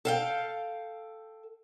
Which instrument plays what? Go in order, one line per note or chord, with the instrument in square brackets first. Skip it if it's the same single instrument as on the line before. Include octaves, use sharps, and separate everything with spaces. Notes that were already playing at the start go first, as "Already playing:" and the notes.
[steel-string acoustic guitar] A4 F5 G5